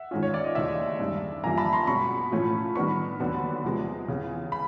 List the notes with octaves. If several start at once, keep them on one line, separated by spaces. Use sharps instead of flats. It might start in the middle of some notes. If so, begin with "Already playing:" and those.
Already playing: E5 F#5
G#2 D#3 G#3 C#4 F4
C#5
D5
D#5
D#2 C#3 E3 A3 D5 E5
G2 D#3 G#3
G2 D3 F3 A#3 G#5 A#5
A5 B5
A#5 C6
B2 G#3 C#4 B5 C#6
A2 F3 A3 C#4 F4
D#3 G3 B3 D4 B5 C#6
D#2 D3 F#3 B3 D4
C3 F3 G#3 B3
E2 C#3 E3
B5